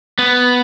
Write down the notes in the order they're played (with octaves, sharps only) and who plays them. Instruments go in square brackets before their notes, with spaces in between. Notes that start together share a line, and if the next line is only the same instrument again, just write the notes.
[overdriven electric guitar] B3